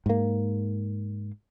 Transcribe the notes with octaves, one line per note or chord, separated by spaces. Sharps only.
G#2 A#3